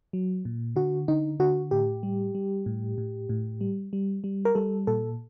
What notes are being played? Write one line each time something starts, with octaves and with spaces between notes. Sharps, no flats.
F#3
A#2
D3 F#4
D3 D#4
D3 F#4
A2 G4
G3
G3
A2
A2
A2
G3
G3
G3
A#4
G3 A4
A#2 A4